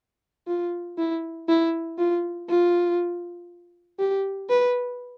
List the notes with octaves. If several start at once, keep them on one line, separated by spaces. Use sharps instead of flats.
F4
E4
E4
F4
F4
G4
B4